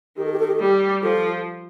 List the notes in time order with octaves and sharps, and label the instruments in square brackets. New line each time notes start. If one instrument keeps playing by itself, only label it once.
[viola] D#3 [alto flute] G4
[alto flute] A4
G4
A4
G4
A4
[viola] G3 [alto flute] G4
[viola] F3 [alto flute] A4